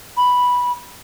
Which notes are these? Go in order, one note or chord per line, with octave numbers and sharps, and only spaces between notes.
B5